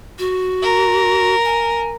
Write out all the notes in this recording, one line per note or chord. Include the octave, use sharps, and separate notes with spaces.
F#4
A#4
G#5